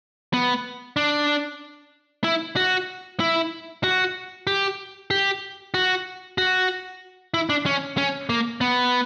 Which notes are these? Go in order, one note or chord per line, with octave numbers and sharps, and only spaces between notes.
B3
D4
E4
F#4
E4
F#4
G4
G4
F#4
F#4
E4
D4
C#4
C#4
A#3
B3